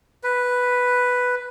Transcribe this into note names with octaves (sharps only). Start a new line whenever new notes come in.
B4